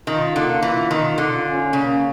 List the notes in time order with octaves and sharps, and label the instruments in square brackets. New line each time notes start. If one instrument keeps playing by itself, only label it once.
[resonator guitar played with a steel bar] D#3 [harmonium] F4
[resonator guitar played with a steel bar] D3 [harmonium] A#3
[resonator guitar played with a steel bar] E3 [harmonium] F4
[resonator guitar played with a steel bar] D#3 [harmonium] F4
[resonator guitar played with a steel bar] D3 [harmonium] F4
[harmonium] C#4
[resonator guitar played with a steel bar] C#3 [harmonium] A#3